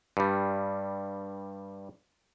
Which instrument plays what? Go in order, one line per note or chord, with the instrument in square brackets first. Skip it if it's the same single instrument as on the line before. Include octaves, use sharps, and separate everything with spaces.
[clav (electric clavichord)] G2 G3